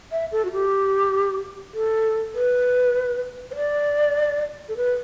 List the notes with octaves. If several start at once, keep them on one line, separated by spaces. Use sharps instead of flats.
E5
A4
F#4
G4
A4
B4
C5
D5
A4
B4